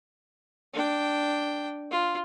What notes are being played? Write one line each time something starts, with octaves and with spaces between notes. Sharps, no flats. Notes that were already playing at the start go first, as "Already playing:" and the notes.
D4 G5
F4